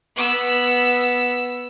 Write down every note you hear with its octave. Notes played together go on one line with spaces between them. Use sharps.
B3 E6